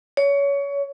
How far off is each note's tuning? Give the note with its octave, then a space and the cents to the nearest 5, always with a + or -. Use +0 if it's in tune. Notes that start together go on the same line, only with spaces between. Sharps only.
C#5 +25